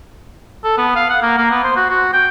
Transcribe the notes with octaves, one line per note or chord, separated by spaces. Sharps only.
A4
B3
F5
F#5
A#3
A#3
B3
C5
F#4
F#4
G5